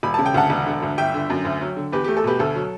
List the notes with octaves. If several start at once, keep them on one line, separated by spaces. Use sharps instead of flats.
E1 B5
C#3 A5
G5
D2 F#5 A5
E1
D3
D2
G1 E5 G5
D3
F#2
D2
F#3
D3
E2 G4 B4
A3 G4
A4
B2 G4 B4
D2 A4
F#3